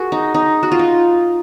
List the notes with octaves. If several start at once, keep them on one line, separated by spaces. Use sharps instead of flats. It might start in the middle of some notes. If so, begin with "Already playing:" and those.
Already playing: F#4 G#4 A#4
D#4
D#4
F#4
F4
D#4